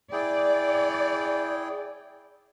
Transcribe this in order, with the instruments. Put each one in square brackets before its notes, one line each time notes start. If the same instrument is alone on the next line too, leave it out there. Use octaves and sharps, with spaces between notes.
[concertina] E4 G#4 G5 [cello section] D5